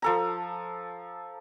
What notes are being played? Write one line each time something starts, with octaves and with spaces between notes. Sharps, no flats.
F3 A4 A#5